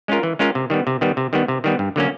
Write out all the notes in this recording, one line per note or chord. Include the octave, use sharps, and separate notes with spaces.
G#3 C#4 F4 A#4
E3
G#3 C#4 F4 A#4
C3
D#3 G3 B3
C3
D#3 G3 B3
C3
D#3 G3 B3
C3
D#3 G3 B3
G2
D3 F#3 A#3 C#4